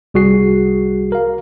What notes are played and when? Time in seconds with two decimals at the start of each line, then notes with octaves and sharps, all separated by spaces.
0.14 C2 G3 F#4 G#4 C7
1.12 A#4 F5